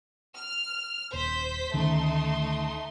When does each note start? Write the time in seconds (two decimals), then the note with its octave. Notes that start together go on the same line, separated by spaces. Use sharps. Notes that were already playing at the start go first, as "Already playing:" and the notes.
0.35 F6
1.13 D#1 C5 G6 B6
1.74 D2 D#3 A3 C#4 D#4 C6